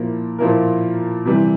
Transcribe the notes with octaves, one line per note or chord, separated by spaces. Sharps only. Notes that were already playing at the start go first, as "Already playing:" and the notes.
Already playing: A#2 F3 A#3 E4
A#2 F3 A#3 E4 A#4
C3 E3 G3